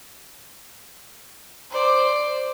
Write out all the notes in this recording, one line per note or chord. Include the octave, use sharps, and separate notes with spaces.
C5 D5